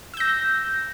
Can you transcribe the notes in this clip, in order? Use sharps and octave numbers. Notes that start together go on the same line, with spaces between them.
E6 G6 A#6